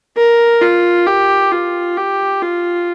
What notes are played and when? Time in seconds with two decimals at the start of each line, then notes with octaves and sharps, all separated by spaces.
0.17 A#4
0.61 F4
1.07 G4
1.52 F4
1.97 G4
2.42 F4